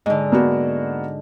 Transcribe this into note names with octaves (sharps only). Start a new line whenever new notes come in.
G#2 D3 D#5
A#3 B3 F#4